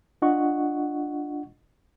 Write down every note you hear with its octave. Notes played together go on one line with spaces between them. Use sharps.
D4 F4 D#5 F#5 C#6